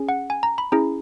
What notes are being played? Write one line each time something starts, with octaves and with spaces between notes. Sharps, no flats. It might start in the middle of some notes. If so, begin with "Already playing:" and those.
Already playing: C#4 G#4
F#5
G#5
A#5
B5
C#4 E4 G#4 A#5